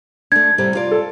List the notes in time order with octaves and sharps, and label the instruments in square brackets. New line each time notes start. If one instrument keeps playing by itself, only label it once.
[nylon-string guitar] A3 D4 [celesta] G#6
[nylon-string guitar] A2 C3 G3
F4 D5
[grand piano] A4